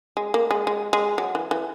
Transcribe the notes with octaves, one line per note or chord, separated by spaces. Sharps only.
G#3
A#3
G#3
G#3
G#3
F#3
E3
E3